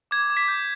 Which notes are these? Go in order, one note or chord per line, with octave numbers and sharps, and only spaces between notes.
D6 G#6
D6
B6
G6